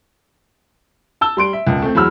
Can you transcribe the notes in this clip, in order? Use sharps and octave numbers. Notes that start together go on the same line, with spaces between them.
A5 E6 G7
G3 C6 D7
E5
E1 C#2
A3 C4
E2 F#3 G#4 B5 E6 F6